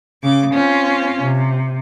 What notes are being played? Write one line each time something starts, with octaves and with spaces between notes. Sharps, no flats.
C#3 D6
C4 C#4 F4
C3